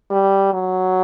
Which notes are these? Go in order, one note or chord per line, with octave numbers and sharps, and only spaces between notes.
G3
F#3